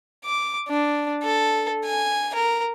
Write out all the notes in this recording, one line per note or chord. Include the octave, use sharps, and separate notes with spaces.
D6
D4
A4
G#5
A#4